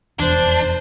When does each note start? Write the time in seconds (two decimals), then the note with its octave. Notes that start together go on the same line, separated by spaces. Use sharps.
0.19 F1 E2 D4 C5